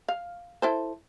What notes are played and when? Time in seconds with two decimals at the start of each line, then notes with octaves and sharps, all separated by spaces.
0.08 F5
0.62 E4 A4 C5